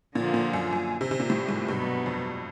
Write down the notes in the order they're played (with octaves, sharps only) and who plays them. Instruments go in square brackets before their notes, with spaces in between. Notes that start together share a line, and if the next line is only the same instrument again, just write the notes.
[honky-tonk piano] A#2 [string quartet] D3 F3 A#3
[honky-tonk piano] A#2
F#2
F#2
C3
C3
A#2
A2
G#2
[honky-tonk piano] G2 [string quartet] B2 F#3 B3
[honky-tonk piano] F2